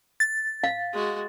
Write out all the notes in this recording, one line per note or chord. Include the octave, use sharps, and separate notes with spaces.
A6
F5
G#3 F#4